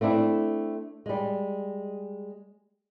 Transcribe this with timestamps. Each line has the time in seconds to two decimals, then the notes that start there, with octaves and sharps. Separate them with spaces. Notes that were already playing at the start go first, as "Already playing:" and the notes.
0.01 A3 C4 D4 E4
1.06 G3 G#3